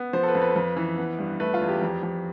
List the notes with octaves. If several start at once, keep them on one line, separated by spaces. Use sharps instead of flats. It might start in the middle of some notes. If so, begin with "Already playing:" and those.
Already playing: B3
F3 C5
A4
B4
F2
B4
F2
E3
B3
G2
A3 B4
F4
E2
G4
F2
F2